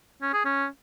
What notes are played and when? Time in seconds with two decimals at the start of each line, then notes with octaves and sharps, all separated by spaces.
0.22 C#4
0.33 G#4
0.45 C#4